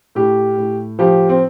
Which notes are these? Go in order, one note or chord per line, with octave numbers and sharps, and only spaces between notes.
A2 G4
A2
F3 G4
C4